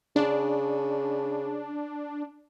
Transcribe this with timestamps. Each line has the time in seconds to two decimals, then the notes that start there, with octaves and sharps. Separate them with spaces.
0.16 C#3 D4